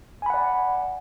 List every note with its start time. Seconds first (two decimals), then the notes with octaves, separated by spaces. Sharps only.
0.22 G#5
0.26 B5
0.30 F#5
0.34 D5